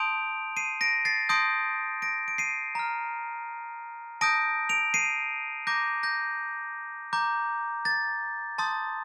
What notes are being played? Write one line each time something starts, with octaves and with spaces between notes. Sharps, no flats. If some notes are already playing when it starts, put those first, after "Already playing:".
Already playing: A5 C6 D#6 G6 D7 F7
C7 D#7
A#6 D7
A6 C7
A5 C6 D#6 G6 A#6 D7
A#6 D7
D7
C7 D#7
A#5 F6
A5 D#6 G6 A#6 D7
D7 F7
C7 D#7
A#5 D6 G6 A#6
G6 A#6
A#5 D6 G6
A6
A5 C6 D#6 G6 A6